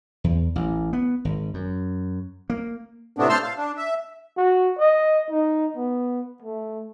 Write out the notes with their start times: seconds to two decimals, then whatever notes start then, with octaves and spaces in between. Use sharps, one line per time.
0.24 E2
0.56 A1
0.93 B3
1.25 G#1
1.54 F#2
2.50 A#3
3.17 A2 C3 A3 B3 C4 D4
3.29 C5 A5 C6 E6 F6
3.43 F5
3.58 D4
3.77 E5
4.37 F#4
4.78 D#5
5.30 D#4
5.77 B3
6.42 A3